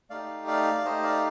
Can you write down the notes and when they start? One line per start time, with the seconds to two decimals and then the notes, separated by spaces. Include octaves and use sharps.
0.10 A3 D#4 G4 D5 F5
0.47 D5 F5
0.85 A3 D#4 G4 C5 D#5
1.04 D5 F5